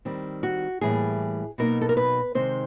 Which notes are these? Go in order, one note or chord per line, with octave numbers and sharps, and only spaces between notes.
D#3 G3 C4
F#4
A2 E3 G3 A#3 G#4
B2 F#3 A#3 D#4 A#4
A4
A#4
B4
C3 D#3 G#3 C4 D#4 C5